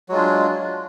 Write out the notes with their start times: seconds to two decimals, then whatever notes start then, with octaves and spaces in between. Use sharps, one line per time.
0.09 F#3
0.11 G#3
0.14 F4
0.16 D4